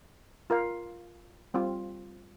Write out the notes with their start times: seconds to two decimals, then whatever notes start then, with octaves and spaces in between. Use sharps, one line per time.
0.50 F4 A#4 F5
1.54 G3 C4 F4